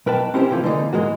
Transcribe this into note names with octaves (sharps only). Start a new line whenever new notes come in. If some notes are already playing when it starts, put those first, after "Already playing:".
B1 A#4 B4 G5 A5
C4 C#4 E4 G4 A#4 C5
C3 E3 F3 A3
D3 E3 G#3 A#3 B3 D#4
G#2 E3 G#3 A#3 F#4